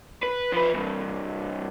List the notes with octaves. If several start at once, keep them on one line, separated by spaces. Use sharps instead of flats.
B4
F3 B4
C2 G2